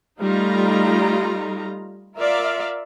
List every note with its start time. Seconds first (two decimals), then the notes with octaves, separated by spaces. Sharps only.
0.21 G3 A3 D#4 F4 A#5
2.16 F4 A#4 D5 E5 F5